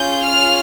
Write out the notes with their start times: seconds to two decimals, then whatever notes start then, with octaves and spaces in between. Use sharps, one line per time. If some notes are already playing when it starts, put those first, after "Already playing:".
Already playing: C#4 F4 G#4 G6
0.23 F6